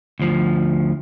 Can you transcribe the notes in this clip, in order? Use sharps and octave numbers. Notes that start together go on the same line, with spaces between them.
D2 F3